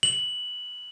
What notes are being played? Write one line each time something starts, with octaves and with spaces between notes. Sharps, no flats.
F#7